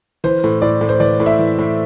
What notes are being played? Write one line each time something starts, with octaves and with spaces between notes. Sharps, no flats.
E3 C5
A2
A2 D5
A2
C5
E3 D5
A2
E5
E3
A2